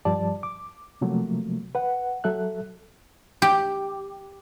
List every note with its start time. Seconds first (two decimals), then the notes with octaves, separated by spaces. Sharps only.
0.05 G2 F3 G3 D5 A5
0.43 D6
1.01 C3 F3 F#3 A3 A#3
1.75 B4 F#5
2.24 F#3 A4 E5 F#6
3.42 G4